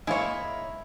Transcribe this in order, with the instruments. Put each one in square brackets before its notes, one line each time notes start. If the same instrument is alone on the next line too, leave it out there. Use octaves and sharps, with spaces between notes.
[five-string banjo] G#3 A#3 C#5 [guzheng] E4